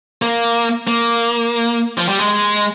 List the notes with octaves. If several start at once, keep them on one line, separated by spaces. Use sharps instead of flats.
A#3
A#3
F3
G3
G#3